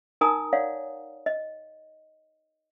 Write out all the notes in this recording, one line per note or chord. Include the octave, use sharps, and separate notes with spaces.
D#4 A#4 G#5 A#5 D#6
C#5 D5 F5 F#5
D#5